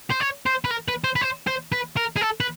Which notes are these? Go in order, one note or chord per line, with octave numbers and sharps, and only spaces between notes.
C5
C#5
C5
B4
A#4
B4
C5
B4
C5
C5
B4
A#4
G#4
A4
B4